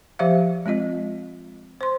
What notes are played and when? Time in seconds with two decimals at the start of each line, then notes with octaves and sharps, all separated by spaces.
0.19 F3 G4 C5 E5 F5
0.66 G#3 C4 F4 D#5
1.81 C5 C6